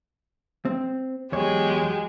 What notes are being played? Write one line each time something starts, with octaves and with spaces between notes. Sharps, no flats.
C4
E2 F#3 G#3 G4 C#5